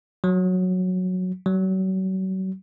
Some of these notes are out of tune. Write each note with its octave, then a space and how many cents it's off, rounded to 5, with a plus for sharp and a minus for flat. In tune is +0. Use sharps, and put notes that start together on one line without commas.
F#3 -10
F#3 +35